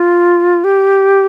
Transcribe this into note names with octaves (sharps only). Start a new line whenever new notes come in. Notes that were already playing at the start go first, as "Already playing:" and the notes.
Already playing: F4
G4